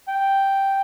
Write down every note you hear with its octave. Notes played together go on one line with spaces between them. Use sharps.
G5